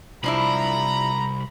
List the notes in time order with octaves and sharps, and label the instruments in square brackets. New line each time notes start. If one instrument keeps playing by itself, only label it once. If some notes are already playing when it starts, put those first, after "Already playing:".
[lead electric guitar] C2 [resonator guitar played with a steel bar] F3 D4 E4 [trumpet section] A#5 [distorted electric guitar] B5